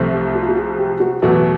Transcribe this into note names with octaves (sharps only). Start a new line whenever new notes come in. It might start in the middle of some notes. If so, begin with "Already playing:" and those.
Already playing: C2 C3 F3 A3
G4
F#4
F4
F#4
G#4
G4
F#4
E2 B2 F#3 A3 F#4